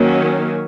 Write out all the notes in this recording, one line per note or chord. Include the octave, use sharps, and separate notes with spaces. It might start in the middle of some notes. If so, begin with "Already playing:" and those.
Already playing: D#3 F#3 A#3 C#4